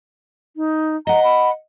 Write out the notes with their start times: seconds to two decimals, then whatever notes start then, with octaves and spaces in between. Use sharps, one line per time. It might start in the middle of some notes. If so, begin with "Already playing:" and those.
0.57 D#4
1.07 D#5 F#5 A#5
1.24 B5